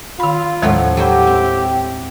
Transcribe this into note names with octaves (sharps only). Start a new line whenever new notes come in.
D#3 F4 B5
D#2 A2 D#3 F3 F#3 G#3
F#3 E4 G4 C5
C4